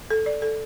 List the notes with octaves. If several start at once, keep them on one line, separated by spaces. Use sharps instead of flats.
A4
D5
A4